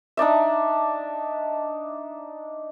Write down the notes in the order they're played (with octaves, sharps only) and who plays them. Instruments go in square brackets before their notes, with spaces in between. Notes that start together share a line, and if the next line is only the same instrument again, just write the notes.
[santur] D4 D#4 D5 E5